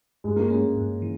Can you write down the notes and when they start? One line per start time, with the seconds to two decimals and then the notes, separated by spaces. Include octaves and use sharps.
0.24 G2 G#3
0.36 A#3
0.49 G#3 C#4
0.76 G2
1.02 E3